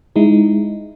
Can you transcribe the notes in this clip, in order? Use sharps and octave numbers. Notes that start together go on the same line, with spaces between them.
G#3 D#4 E4